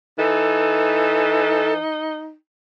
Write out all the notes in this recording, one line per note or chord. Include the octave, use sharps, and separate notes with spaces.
E3 D#4 A4